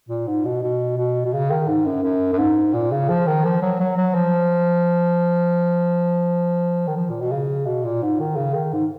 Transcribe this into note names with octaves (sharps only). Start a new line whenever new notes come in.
A#2
G#2
B2
B2
B2
B2
C#3
D#3
G#2
F#2
F#2
F#2
G#2
A#2
C#3
F3
D#3
F3
F#3
F#3
F#3
F3
D#3
F3
A#2
B2
C#3
B2
A#2
G#2
D#3
C#3
D#3
G#2